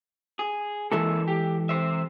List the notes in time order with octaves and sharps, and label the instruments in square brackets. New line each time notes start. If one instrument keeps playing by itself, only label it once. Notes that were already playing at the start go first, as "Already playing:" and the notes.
[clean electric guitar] G#4
[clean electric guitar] C#2 A#3 E5 [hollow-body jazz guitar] E3 G#3 A4
[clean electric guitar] G4
C3 C5 E5